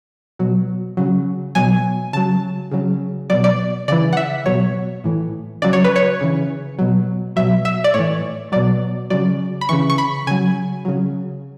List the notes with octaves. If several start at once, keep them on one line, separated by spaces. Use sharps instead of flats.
B2 F#3
C#3 F#3
B2 F#3 G#5
C#3 F#3 A5
C#3 F#3
B2 F#3 D5
D5
C#3 E3 D5
F#5
E5
B2 F#3 C#5
A2 E3
C#3 F#3 D5
C#5
B4
C#5
C#3 E3
B2 F#3
B2 F#3 E5
E5
D5
A2 E3 C#5
B2 F#3 D5
C#3 F#3 D5
B5
C#3 E3 C#6
C#6
B5
C#3 F#3 G#5
C#3 F#3